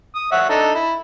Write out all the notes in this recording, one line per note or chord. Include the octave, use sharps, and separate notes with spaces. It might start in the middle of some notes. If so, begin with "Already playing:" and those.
D#6
C#5 E5 F#5
D4 D#4 A4
E4